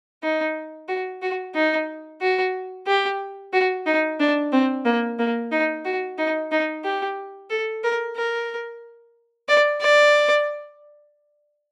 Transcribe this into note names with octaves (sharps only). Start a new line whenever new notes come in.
D#4
F#4
F#4
D#4
F#4
G4
F#4
D#4
D4
C4
A#3
A#3
D#4
F#4
D#4
D#4
G4
A4
A#4
A#4
D5
D5